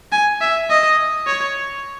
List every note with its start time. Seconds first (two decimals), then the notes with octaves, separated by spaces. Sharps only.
0.12 G#5
0.41 E5
0.70 D#5
1.27 C#5